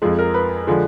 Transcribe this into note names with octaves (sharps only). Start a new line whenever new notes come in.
F2 F3 G#3 G#4
A#4
B4
D3 F3 G#3